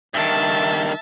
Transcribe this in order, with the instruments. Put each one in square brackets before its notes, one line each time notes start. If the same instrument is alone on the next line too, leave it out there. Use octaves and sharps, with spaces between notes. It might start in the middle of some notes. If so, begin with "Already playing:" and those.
[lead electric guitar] G2 D#3 [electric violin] E5 A5